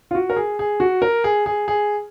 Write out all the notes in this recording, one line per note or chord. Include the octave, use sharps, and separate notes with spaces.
F4
F#4
A#4
G#4
G#4
F#4
A#4
G#4
G#4
G#4